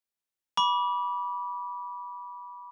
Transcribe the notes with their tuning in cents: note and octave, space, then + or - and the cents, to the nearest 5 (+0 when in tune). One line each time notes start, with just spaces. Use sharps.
B5 -20 D6 -20